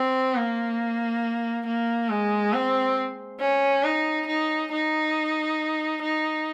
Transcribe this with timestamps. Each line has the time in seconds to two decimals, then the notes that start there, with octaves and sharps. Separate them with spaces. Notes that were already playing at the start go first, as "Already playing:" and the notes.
Already playing: C4
0.36 A#3
1.66 A#3
2.10 G#3
2.53 C4
3.40 C#4
3.84 D#4
4.28 D#4
4.72 D#4
6.02 D#4